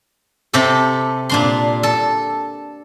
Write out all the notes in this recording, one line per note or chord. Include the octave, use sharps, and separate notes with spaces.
C3 G4 A4
A#2 D4 C6
A4